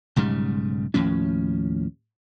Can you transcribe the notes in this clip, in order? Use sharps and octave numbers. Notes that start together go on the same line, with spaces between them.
B1 G#2 C#3 G3
D#2 A2 F3 C#4